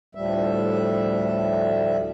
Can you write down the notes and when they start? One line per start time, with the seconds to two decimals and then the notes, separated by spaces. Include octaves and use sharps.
0.15 D2 A2 F3 G3 E5